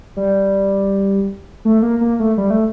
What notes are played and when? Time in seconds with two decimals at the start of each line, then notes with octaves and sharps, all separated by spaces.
0.17 G3
1.65 A3
1.82 A#3
2.01 A#3
2.20 A3
2.38 G3
2.50 A3